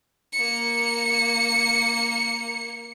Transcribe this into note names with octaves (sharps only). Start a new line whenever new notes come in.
A#3 C#7